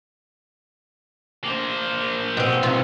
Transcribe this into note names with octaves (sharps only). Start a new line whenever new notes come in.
A#3 C5
B2 C4
C2 F4